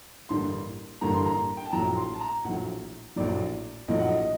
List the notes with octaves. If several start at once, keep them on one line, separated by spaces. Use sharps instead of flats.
A1 G2 D3 G3 A#3 C6
A1 G2 D3 G3 A#3 A#5
C6
A#5
G5
A5
A#1 A2 F#3 A#5
C6
A5
A#5
A#1 A2 F#3 F#5
A#1 A2 F#3 D5
A#1 A2 F#3 D#5
F#5
D#5